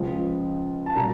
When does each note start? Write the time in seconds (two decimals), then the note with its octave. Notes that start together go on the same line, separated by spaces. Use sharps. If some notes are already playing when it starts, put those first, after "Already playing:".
Already playing: C#2 C#3 F3 G#3
0.86 A5
0.95 A#2 G3 A#3 A#5